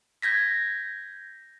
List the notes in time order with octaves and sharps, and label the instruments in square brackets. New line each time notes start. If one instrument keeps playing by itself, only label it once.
[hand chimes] G6 G#6 A#6 B6